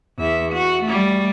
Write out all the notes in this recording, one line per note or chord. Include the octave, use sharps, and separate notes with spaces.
E2 E5
F#4
G3 A3